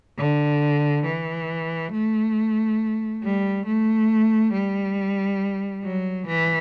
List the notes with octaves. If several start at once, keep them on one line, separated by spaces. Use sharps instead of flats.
D3
E3
A3
G3
A3
G3
F#3
E3